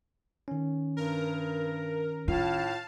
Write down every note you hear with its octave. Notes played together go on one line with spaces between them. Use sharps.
D#3 C#4
G2 A#4
A2 F4 F5 A5